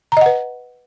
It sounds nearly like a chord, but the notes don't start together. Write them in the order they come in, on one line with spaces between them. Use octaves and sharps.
A#5 D#5 F#5 B4